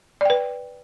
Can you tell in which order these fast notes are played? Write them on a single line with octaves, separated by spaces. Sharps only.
D5 G5 B4